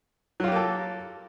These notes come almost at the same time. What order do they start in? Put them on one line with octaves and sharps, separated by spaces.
F#3 F4 G4 A#3 A4